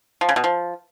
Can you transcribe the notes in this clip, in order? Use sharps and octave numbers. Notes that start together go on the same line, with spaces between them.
F3
C#3
B2
F3